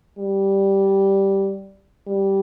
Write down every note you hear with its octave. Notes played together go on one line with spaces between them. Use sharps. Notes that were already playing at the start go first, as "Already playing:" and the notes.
G3
G3